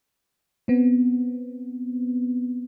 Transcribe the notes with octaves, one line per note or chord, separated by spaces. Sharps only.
B3 C4